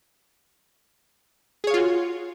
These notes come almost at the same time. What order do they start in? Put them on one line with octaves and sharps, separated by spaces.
G#4 C#5 F5 F4 F#4